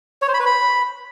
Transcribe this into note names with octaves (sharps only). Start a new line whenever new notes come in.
C#5
C5
B5
B4
B5